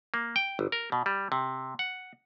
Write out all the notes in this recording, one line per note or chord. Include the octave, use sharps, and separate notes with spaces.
A#3
G5
G1
A#4
B2
G3
C3
F#5